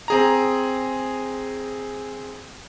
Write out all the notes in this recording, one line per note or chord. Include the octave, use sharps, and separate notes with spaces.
C4 G#4 A#5